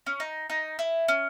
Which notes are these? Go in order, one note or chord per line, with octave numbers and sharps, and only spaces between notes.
C#4
D#4
D#4
E4
C#4